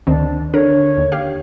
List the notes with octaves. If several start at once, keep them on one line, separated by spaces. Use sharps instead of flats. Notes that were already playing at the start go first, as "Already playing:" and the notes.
D2 D#3 C4 D4
D3 A#4 C#5
D#2
G4 F5